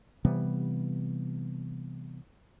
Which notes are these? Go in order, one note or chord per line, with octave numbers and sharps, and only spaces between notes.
C3 E3 G3 B3